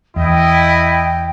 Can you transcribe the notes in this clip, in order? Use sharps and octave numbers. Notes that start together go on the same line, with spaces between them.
E2 E4 D#5 G5